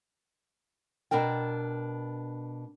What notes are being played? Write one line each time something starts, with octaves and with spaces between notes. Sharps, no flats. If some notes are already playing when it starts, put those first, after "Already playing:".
B2 D4 A#4 G5